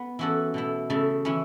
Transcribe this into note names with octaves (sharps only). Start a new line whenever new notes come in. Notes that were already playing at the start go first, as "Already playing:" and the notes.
Already playing: B3
E3 C#4 F#4 A4
B2 A3 E4
C#3 A3 E4
E3 C#4 E4